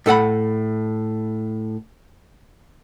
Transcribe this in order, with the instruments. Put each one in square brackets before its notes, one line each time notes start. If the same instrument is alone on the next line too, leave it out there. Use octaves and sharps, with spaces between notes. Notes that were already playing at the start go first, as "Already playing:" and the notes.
[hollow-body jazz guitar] A2 A4 F#5 B5